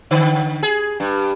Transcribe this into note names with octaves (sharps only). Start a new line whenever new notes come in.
D3
G#4
G2